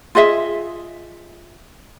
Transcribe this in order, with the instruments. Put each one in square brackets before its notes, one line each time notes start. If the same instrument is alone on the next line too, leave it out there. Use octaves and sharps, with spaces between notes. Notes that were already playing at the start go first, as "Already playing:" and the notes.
[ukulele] F4 G#4 D#5 E5